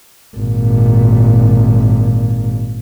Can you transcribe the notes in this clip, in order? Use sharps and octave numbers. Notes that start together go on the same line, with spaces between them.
G#1 A#2